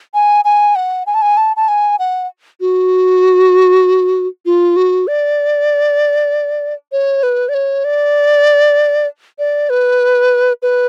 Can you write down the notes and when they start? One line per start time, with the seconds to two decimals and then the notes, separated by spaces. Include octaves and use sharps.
0.14 G#5
0.45 G#5
0.75 F#5
1.07 G#5
1.14 A5
1.22 G#5
1.37 A5
1.56 A5
1.68 G#5
1.99 F#5
2.61 F#4
4.46 F4
4.76 F#4
5.07 D5
6.92 C#5
7.23 B4
7.49 D5
7.54 C#5
7.84 D5
9.39 D5
9.70 B4
10.62 B4